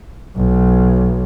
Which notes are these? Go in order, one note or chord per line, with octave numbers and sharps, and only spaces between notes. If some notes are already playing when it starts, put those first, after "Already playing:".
B1